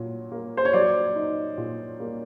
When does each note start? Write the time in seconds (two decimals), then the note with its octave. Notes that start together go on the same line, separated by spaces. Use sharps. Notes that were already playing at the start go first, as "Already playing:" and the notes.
Already playing: A#2 F#3
0.32 A#3
0.57 C5
0.65 C#5
0.73 F#3 C5 D5
1.15 D#4
1.58 A#2
2.00 A#3